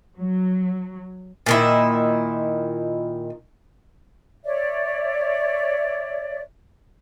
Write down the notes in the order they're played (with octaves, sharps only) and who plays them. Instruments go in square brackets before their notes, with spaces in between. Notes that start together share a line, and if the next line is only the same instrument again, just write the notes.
[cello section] F#3
[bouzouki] A#2 D#3 E4
[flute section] C#5 D5 E5